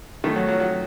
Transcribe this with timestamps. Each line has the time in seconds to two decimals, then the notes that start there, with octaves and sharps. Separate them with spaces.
0.24 F#2 D#3 A3
0.36 F#3
0.48 F#3
0.60 F#3